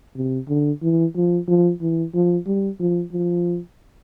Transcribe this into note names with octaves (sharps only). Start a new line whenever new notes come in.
C3
D3
E3
F3
F3
E3
F3
G3
F3
F3